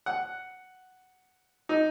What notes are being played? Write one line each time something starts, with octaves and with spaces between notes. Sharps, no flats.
F#5
D#4